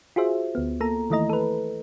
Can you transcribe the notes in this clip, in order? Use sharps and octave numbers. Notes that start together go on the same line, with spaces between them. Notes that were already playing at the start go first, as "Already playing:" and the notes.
F4 F#4 G#4 C5 E5
D2 B3
A#3 A4 A#5
D#3 E3 A3 E4 D#5 A#5
A4 B4